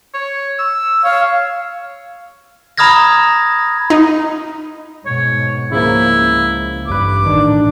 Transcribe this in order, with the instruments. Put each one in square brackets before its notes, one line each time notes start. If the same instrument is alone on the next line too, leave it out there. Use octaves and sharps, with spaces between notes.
[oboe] C#5
E6
[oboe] C#5 [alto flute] F5
[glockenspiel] A#5 B5 D#6 F6 G#6 A#6
[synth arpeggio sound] D#4
[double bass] G#2 B2 [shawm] C#5
[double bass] C#2 [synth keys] C#3 F3 A#3 [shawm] E4
[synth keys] A1 G2 B4 [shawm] D6
[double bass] A1 D4 [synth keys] D#3